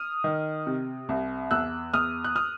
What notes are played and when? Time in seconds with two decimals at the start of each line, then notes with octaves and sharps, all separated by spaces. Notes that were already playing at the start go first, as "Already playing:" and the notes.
Already playing: D#6 F6
0.24 D#3
0.67 C3
1.09 C2
1.51 E2 E6 F#6
1.93 E2 D#6 F6
2.24 F#6
2.36 D#6 F6